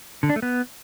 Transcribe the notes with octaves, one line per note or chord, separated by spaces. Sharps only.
D3
D4
A3
B3